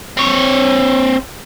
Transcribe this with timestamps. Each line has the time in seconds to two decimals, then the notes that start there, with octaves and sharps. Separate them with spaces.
0.17 C4 C#5